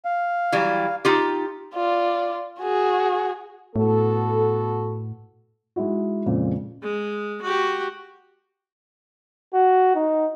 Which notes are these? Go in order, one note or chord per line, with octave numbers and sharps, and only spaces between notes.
F5
E3 F#3 G3
D#4 F4 G4
F4 D5
F#4 G#4
A2 B3 F#4 A4
G#3 D#4 E4 F#4
F2 A#2 C#3 G#3 C4
G#3
F#4 G4
F#4
D#4